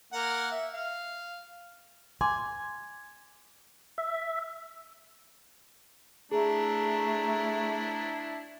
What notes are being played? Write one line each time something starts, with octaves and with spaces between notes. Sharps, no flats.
A#3 A#4 F#5
E5
F5
G#5 C6 D6
E5
A3 D4 E4 G#4 A#5